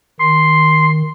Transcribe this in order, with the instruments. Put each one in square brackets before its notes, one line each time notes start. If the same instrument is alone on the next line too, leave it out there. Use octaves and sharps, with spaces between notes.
[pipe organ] D#3 [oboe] C6